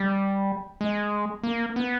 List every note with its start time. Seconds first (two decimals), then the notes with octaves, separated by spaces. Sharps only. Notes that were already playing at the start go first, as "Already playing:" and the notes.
Already playing: G3
0.81 G#3
1.43 A#3
1.76 B3